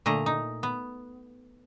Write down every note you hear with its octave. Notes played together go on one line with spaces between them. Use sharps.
A#2 D3 A3 D#5 A#5
D#4
B3